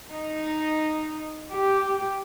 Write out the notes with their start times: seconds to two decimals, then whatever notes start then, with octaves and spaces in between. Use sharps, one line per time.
0.11 D#4
1.52 G4